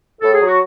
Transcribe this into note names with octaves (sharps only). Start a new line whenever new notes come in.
A2 A4
G#4
F#3
F#4